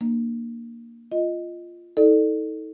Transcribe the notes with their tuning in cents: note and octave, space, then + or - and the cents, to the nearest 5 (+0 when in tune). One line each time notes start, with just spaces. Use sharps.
A#3 +0 D4 +35
F4 -5 D#5 +0
D#4 +40 A4 +0 D5 +30